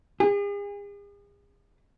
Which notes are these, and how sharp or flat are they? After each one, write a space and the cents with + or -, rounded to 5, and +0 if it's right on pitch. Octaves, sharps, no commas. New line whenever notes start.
G#4 -40